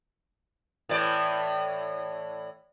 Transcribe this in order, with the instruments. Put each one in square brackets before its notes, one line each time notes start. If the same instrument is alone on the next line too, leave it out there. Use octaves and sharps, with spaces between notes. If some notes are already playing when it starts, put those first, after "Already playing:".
[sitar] A2 E3 D5